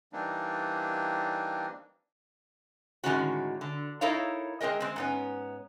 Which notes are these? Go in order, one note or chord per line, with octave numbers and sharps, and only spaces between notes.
E3 G3 A#3 C4 D4 D#4
A2 D3 D#3 G#3 C#4 F#4
D3
D#4 E4 A4 A#4 C#5 F5
G#3 C4 G#4 A#4 D#5
G#3 C4
G#2 B3 C#4